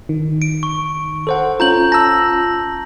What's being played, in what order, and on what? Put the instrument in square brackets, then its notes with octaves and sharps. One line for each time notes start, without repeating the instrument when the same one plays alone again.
[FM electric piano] D#3
[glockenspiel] D7
C#6
[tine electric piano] A4 C5 F#5
[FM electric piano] C#4 F4 [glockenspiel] A#5 G6 F#7
[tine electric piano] A5 A#5 E6 [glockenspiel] A#6